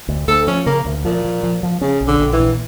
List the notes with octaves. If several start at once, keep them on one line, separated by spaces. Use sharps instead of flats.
D2
D2 A4
F3 C#4
C#3 A#3
D2
A#2 F3
F3
F3
F3
C#3 C#4
A#1
D3
A#1
E3
A#2